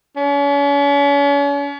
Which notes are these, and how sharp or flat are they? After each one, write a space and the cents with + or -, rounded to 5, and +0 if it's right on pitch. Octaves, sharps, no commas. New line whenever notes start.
C#4 +40